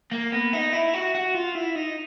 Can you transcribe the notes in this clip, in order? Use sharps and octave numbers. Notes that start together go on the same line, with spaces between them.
A#3
B3
D#4
E4
F#4
F#4
F4
E4
D#4